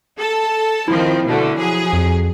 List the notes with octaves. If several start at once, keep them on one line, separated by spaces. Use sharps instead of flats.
A4 A5
D#3 F3 C4 E4
B2 D3 A3
F3 F#3 G#4
F2